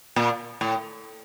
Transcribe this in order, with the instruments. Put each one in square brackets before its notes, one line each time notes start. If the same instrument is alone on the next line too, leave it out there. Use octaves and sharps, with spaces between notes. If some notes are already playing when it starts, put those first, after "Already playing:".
[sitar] A#2
A2